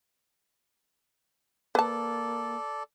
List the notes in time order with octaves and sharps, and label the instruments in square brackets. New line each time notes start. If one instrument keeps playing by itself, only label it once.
[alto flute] A#3 [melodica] A4 D5 [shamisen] B4 A5